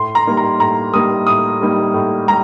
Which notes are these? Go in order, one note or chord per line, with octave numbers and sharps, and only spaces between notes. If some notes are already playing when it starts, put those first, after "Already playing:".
Already playing: A2 C6
A#5
G3 A#3 D#4
A#5
A2 A#5
G3 A#3 D#4 D#6
A2 D#6
G3 A#3 D#4
A2
G3 A#5